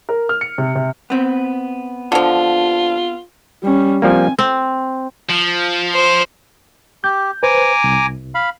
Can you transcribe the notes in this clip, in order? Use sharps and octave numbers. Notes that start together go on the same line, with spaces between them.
A#4
F6
C#7
C3
C3
B3 C4
D3 F3 F4
G3 C#4
F3 G3 A#3 C4 G#5
C4
F3
C5
G4 G6
B4 C5 G#5 A#5 D6
C2
F5 B5